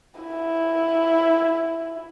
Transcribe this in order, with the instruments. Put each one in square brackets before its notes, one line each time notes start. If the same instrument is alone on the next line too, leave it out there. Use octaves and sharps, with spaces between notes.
[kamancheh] E4